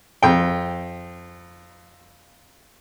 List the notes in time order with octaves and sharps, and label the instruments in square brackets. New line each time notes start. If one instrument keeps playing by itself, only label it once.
[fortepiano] F2 G5